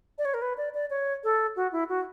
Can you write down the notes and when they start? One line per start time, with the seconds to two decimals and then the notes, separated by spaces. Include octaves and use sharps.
0.18 D5
0.25 C#5
0.34 A#4
0.42 B4
0.57 D5
0.74 D5
0.90 C#5
1.24 A4
1.56 F#4
1.72 E4
1.89 F#4